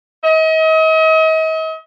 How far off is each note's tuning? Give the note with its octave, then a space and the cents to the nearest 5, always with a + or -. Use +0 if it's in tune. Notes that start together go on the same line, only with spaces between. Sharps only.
D#5 +40